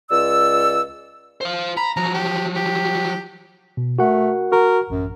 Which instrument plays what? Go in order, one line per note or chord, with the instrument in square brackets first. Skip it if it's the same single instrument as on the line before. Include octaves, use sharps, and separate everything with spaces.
[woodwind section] C#2 D5 E6
[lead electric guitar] C5 F5
[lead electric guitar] A#5 [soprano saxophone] B5
[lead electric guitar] F3 F#3 [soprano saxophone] A#5
[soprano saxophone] G4
G4
[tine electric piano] B2
[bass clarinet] A3 [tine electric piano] F#4 A#4 F#5
[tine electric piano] F#4 [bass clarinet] A#4
[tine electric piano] A1 [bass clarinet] F#2